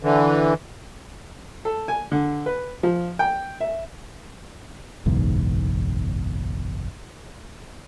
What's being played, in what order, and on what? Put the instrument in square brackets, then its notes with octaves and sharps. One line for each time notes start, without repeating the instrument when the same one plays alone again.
[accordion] D3 E3
[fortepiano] A4
G#5
D3
B4
F3
G5
E5
[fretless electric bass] F#1 B1 E2 G#2